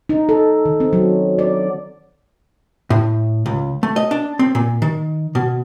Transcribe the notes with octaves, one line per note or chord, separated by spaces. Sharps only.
D#4
A4
D#3
C4
F#3
D5
A2
C#2
A3
D#5
D4
C4
A#2
D#3
B2